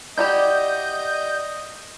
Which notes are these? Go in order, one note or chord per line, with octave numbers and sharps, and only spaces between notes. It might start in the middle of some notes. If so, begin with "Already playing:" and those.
E4 F#4 G4 D5 D#5 G6